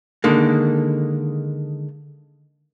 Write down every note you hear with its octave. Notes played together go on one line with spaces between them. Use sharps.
D3 D#3 G#3 A#3